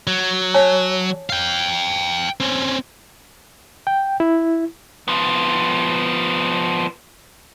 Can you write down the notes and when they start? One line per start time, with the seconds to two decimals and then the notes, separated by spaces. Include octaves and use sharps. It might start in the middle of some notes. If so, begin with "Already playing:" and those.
0.07 F#3
0.54 C#5 G#5 A5
1.30 F5 G5
2.40 C4 C#4
3.87 G5
4.20 E4
5.08 F3 B3